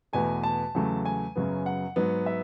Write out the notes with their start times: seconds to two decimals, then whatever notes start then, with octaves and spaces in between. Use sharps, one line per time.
0.13 E2 B2 A3 G#5
0.43 A5
0.75 E2 C#3 F#3 A3
1.05 G#5
1.36 F#2 C#3 F#3 B3
1.66 F#5
1.96 G#2 F#3 B3
2.26 E5